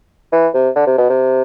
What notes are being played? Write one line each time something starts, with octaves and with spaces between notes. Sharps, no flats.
E3
C3
D3
C3
B2
C3